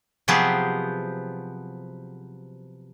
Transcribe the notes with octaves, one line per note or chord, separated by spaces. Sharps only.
C3 F3 F#3 B3 G4 G#4